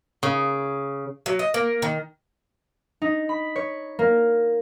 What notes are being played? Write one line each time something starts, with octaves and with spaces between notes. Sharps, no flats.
C#3
F#3
D#5
A#3
D#3
D#4
B5
C#5
A#3